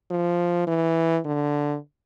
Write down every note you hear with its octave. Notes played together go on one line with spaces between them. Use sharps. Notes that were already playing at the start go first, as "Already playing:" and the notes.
F3
E3
D3